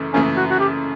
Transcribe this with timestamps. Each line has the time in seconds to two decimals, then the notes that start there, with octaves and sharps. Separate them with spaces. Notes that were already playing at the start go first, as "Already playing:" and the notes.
Already playing: F#2 C#3 E3 A3
0.13 F#2 C#3 E3 A3 C#4
0.37 F#4
0.50 F#4
0.60 G4